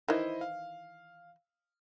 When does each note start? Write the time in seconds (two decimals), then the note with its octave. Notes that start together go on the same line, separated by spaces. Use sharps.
0.08 D#3 E3 E4 C5 D#5
0.41 F5